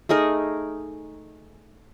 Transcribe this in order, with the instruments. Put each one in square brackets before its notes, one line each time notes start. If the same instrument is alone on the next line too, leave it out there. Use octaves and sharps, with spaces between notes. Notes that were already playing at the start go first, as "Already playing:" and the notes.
[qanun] A3 D#4 G#4 A#4